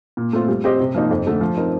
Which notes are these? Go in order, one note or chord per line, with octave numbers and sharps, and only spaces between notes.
A#2
A3 C4 F4
G3
C4 G4 C5 D#5
C3
F3 A#3 D#4
F2
D3 A3
F3
C4 D#4 A#4